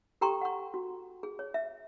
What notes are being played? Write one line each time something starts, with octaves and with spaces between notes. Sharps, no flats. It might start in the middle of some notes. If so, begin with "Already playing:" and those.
G4 A4 G5 A#5 C6 C#6
F#5 C#6
F#4
G#4
C#5
E5